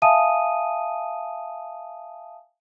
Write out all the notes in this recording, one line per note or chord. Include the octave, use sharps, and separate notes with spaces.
E5 F5 G#5 A5 D#6 D#7